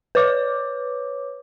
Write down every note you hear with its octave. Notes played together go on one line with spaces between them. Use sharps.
B4 C#5 D6